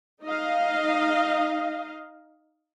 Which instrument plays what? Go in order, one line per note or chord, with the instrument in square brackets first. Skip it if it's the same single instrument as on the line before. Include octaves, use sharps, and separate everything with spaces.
[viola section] D#4 D#5 F5